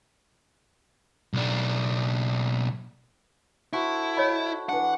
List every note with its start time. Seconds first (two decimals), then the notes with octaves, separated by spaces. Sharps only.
1.33 B1 D4
3.73 E4 F#4 A4 C5
4.17 C#5 D#5 B5
4.69 E3 D4 F#5